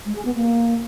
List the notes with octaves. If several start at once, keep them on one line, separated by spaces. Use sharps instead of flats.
G#3
G#4
B3
A#3